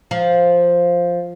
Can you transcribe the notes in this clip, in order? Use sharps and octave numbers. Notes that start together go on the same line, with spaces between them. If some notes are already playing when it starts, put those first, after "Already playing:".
F3